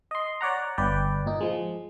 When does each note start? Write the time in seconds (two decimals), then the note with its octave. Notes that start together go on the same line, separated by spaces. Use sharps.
0.11 D#5 C6
0.41 C#5 D5 F#5 A#5
0.78 G1 B4 D5 G5
1.26 A#2 D#4
1.41 F3 G#3